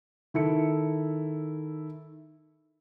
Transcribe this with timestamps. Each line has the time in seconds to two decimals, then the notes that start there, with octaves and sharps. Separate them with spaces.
0.34 D#3 E4 A4 C#7